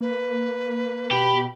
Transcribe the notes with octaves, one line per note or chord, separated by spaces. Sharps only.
A#3 B4
B2 G4 B5